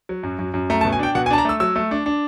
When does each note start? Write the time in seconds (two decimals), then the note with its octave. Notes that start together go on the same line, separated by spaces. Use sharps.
0.09 F#3
0.23 F#2
0.39 F#2
0.54 F#2
0.70 A3 A#5
0.81 A5
0.85 B2
0.92 G#5
0.99 D4 G5
1.15 B2 F#5
1.26 G#5
1.30 D4 A5
1.38 A#5
1.45 A3 E6
1.60 F#3 E6
1.76 A3
1.91 D4
2.06 D4